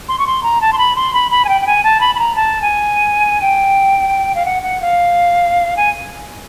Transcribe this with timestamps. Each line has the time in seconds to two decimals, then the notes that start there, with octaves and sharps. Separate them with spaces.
0.09 C6
0.19 C#6
0.27 C6
0.43 A#5
0.61 A5
0.73 C6
0.78 B5
0.96 C6
1.14 B5
1.31 B5
1.45 G#5
1.49 G5
1.61 G5
1.67 G#5
1.84 A5
2.01 B5
2.15 B5
2.19 A#5
2.36 A5
2.62 G#5
3.42 G5
4.35 F5
4.45 F#5
4.63 F#5
4.81 F5
5.77 G#5